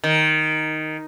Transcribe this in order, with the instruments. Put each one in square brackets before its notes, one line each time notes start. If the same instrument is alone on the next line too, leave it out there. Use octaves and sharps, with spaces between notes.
[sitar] D#3